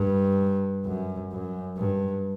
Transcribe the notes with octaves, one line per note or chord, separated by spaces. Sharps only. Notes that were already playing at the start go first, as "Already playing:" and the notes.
Already playing: G2
F#2
F#2
G2